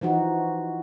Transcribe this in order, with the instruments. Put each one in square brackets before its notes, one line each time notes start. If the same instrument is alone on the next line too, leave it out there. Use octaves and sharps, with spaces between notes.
[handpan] E3 F3 D#4 F#4